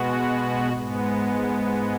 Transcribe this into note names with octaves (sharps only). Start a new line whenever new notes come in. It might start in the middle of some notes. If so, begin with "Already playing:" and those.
Already playing: B2 G#3 B3 F#4
G#2 G#3 B3